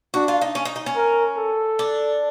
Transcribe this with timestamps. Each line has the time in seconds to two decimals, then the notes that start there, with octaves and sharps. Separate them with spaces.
0.14 D4 F#4
0.28 F4
0.42 D#4
0.55 C#4
0.65 D#4
0.76 D#4
0.86 C#4
0.96 A#4
1.37 A4
1.79 D4